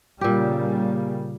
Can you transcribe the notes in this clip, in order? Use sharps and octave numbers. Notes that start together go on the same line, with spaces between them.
A#2 C#3 G3 A#3 G4